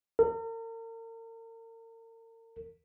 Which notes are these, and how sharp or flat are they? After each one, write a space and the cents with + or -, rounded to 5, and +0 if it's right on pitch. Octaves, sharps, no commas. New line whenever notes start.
A#4 -40